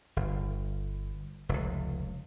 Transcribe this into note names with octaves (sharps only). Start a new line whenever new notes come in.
G1
F1 C#2